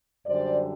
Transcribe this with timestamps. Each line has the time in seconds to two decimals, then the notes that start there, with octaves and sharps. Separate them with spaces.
0.27 F#2 D3 G3 C5 D5